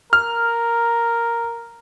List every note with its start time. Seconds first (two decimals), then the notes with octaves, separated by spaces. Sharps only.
0.13 A#4 F6